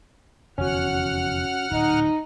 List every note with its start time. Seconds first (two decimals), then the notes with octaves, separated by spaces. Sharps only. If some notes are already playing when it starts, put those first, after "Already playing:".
0.58 F1 E2 D3 C#4 F#4 F#5 F6
1.71 D1 A#2 D#4